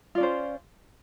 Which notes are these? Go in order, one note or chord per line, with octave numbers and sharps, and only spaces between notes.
C#4 F4 C5 D5